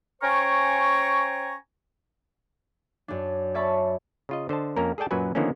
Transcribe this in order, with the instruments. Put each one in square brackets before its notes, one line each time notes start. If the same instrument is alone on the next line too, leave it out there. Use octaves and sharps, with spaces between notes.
[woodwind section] C#4 C5 G5 G#5 A#5 C#6
[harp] F#2 D4
C#5 D5 E5 A5 B5 C#6
[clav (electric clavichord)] C#3 F4 D#5
D3 C5 D#5 A5
F2 A#3 C#4 A#4
G#4 A4 D5 G5 A5
F#2 A#2 F#3 F#4 B4 G#5
D3 D#3 F3 A#3 B3 C#4